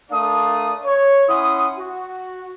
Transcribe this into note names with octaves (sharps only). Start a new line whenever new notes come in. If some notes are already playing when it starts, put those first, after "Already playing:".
A3 D4 A#4 D5 F5 D#6
C#5
C#4 E4 F#5 C6 D#6
F#4